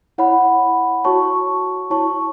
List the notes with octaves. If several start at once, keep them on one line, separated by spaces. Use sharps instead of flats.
E4 C#5 F#5 B5
F#4 C#5 A5 C#6
E4 C#5 A5 C#6